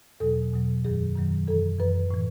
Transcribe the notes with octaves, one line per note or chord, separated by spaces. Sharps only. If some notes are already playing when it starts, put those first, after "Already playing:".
E2 B2 F#3 A4
E2 B2 F#3
F#2 D#3 F#3 G#4
F#2 D#3 F#3
F#2 E3 A4
F#2 E3 B4
A2 E3